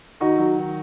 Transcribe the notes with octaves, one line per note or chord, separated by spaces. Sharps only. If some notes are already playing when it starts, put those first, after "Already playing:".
D#3 D#4 F#4
F#3
D#3